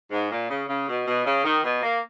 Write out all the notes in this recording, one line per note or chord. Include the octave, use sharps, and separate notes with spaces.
G#2
A#2
C#3
C#3
B2
B2
C#3
D#3
B2
A#3